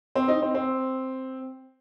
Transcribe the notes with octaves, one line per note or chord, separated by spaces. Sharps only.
C4
D#4
C4
C4